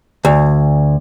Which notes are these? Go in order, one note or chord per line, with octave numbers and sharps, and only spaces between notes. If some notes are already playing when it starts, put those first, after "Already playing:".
D2